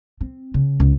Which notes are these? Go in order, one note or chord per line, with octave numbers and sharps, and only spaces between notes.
C4
C#3
C#2